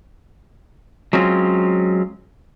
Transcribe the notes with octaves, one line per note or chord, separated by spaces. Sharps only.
F#3 G#3 C4 C#4 F4